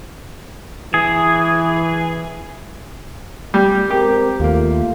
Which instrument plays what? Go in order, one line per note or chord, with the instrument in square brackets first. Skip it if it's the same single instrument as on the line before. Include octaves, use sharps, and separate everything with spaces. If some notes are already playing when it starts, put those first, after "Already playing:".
[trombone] E3 [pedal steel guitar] G#4
[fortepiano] G3
[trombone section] G#3 C4 A#4 [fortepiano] G4
[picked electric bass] D#2 A#3 [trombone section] A3 F4